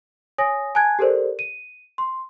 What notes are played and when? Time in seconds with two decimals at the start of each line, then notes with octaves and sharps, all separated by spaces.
0.38 C#5 G#5 D#6 A#6
0.75 G#5 A5 F#6 G#6
0.99 G4 A4 A#4 C5 D5
1.39 D#7
1.98 C6